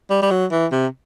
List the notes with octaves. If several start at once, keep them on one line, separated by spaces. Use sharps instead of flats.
G3
G3
F#3
E3
C3